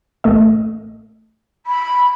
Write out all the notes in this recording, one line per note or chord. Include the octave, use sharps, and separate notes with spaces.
A1 A3 D#5
B5